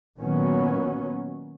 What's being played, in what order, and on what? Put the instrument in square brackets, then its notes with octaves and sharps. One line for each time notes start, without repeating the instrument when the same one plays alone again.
[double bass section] A#2 D#3 F#3 B3 C#4